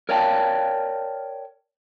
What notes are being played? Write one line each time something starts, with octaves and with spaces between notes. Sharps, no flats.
A#4 C#5 D5 F5 G5 A5